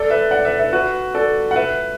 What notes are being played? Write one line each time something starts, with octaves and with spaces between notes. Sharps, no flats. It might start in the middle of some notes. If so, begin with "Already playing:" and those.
Already playing: A4 D5
B4 E5
D5 F#5
B4 E5
B4 E5
F#4 B4
A4 D5
F#5
B4 E5